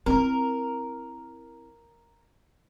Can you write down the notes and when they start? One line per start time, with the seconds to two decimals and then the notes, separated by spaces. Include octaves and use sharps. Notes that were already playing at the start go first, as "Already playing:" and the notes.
0.06 C4 E4 A#4